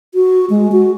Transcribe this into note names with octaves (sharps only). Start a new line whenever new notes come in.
F#4
G#3
F#4